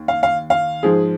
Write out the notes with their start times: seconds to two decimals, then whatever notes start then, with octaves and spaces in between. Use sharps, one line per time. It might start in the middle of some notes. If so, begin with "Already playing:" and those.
Already playing: D#2
0.08 F5
0.23 F5
0.50 F5
0.83 G#2 F3 G#3 G#4